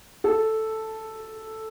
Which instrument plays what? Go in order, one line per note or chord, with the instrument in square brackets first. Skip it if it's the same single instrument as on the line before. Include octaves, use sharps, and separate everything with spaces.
[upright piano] A4